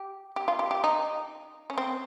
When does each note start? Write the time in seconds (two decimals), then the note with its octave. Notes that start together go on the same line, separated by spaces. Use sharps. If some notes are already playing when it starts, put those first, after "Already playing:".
Already playing: G4
0.36 G4
0.48 F4
0.59 G4
0.71 G4
0.84 D#4
1.70 C#4
1.78 C4